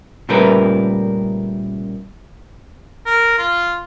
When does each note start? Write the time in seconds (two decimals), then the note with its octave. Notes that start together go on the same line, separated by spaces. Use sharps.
0.29 A#2 C#3 G3 A3 A#4 B4
3.06 A#4
3.38 F4